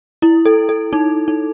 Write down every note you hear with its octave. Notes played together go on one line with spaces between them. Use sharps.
E4
A4
A4
D#4
D#4